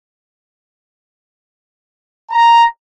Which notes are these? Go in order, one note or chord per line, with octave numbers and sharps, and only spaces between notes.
A#5